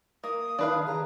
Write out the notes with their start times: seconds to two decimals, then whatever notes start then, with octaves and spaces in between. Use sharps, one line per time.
0.24 A#3 D#6
0.59 D#3 D4 B4 F5
0.87 G#4 A#5